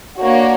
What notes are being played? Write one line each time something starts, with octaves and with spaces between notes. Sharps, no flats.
A#3 D4 F#4 C#5